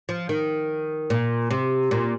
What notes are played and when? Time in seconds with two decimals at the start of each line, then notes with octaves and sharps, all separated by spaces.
0.09 F3
0.29 D#3
1.10 A#2
1.51 C3
1.91 A#2